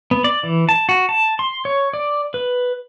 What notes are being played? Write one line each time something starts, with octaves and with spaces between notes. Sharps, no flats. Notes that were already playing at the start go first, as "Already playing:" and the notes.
B3
D5
E3
A5
F#4
A5
C6
C#5
D5
B4